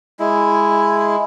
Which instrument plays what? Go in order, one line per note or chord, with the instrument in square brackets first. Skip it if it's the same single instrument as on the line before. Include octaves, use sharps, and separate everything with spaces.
[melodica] G#3 E4